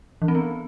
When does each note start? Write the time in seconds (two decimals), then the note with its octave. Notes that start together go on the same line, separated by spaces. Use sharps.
0.22 E3
0.28 C4
0.35 B3